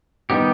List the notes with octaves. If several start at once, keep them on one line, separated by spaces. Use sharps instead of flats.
D#3 G3 B3 D#4 G4